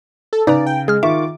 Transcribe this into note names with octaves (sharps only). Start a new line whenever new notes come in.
A4
C#3 D#4 B4 D5 A#5
G5
G#3 G#4 F6
D#3 F4 E5 C#6 D6